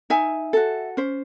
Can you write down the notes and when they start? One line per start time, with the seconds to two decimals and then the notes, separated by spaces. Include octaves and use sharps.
0.10 D#4 E5 G#5
0.53 F#4 A4
0.97 C#4 C5